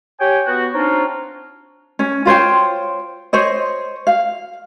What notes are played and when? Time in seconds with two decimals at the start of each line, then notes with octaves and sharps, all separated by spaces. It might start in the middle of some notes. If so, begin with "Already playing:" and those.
0.19 G4 C#5 G5 G#5
0.46 B3 F#4
0.73 C4 D4 D#4 F4 C#5
1.99 C#4
2.25 F4 C5 C#5 G5
3.33 C5 C#5 D#5
4.07 F5